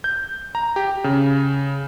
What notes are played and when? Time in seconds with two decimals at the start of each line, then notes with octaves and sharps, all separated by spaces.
0.04 G6
0.55 A#5
0.76 G4
1.04 C#3